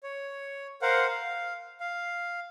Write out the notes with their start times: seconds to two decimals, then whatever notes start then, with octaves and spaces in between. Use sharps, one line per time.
0.03 C#5
0.82 A#4 C5 F5 F#5
1.07 F5
1.80 F5